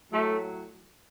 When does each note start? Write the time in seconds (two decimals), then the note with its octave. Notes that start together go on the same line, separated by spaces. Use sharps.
0.12 A2 F#3 A3